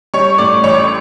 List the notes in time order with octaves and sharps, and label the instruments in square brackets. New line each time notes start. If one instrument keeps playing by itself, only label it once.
[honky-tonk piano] G3 C#5 C#6
A2 D5 D6
A1 C#5 C#6